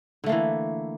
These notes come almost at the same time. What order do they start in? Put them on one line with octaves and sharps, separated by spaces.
D3 A3 A#3 E3